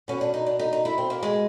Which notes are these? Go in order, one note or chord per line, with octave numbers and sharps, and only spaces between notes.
B2 C#4
D4
D#4
D4
D#4
D#4
E4
C4
A#3
G#3